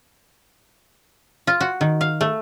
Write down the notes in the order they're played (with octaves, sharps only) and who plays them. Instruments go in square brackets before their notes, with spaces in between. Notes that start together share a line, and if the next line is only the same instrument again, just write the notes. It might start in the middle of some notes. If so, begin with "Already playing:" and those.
[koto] F4
F#4
D#3
F5
A3